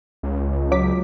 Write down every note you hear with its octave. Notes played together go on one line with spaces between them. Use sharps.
C#2
F#3 D6 B6